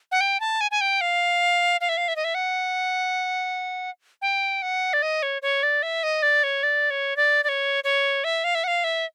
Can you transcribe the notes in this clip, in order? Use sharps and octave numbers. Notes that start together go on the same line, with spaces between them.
F#5
G5
A5
G#5
G#5
G5
F5
F5
E5
F5
E5
D#5
E5
F#5
G5
F#5
D5
D#5
C#5
C#5
D5
E5
D#5
D5
C#5
D5
C#5
D5
D5
C#5
C#5
E5
F5
E5
F#5
F5
E5